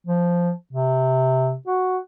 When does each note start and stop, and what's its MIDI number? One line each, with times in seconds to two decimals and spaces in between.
0.07 0.52 53
0.73 1.55 48
1.67 1.97 66